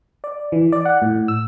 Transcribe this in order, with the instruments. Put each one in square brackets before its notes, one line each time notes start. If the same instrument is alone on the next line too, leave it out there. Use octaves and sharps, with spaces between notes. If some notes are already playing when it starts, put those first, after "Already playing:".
[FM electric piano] D5
E3
D5
F#5
A2
E6